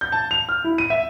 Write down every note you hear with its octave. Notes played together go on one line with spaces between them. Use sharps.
G6
A5
F7
F6
E4
D#7
E5